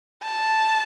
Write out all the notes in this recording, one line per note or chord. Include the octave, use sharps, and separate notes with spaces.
A5